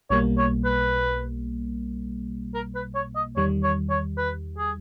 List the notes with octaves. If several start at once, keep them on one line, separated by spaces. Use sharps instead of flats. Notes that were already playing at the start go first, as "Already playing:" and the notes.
B1 B2 G3 A#3 C#5
C#5
B4
A#4
B4
C#5
D#5
E2 D#3 G3 C#5
C#5
C#5
B4
G#4